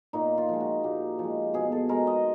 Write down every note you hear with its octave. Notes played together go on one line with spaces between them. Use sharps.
A#2 D#4
F4
F3 G#3
F#4
A#2 G4
F3 G#3
B2 G#4
A4
G#3 A#4
D#5